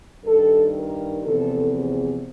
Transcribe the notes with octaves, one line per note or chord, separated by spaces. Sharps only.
G2 D#3 A4
A#4
E2 C3 F3 A4
G#4